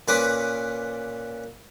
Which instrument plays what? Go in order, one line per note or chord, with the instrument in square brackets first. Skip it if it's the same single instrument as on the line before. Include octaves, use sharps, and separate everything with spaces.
[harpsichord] A#2 C#4 B4 D6 D#6